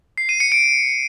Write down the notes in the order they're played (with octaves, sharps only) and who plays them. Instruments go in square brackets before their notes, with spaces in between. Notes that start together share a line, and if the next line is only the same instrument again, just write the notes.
[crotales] C7
D#7
C#7
D7